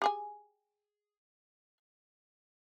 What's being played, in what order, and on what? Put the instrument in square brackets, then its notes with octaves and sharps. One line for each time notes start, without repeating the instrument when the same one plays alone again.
[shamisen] G4 G#4 G#5